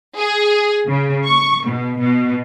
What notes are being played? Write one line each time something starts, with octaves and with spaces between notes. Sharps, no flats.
G#4
C#3
C#6
B2
B2